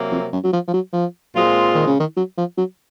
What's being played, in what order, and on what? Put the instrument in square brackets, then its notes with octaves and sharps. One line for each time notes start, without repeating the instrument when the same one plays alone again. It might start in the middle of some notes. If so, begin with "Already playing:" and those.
Already playing: [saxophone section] C3 F#3 A#3
[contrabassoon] F2
F#2
F#3
F3
F3
F#3
F3
[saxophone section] A#2 G#3 C4 F4 [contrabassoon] F#3
[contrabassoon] D#3
C#3
D#3
F#3
F3
F#3